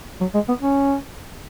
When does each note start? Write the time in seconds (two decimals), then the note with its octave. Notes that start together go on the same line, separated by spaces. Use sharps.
0.21 F#3
0.34 G#3
0.48 B3
0.62 C#4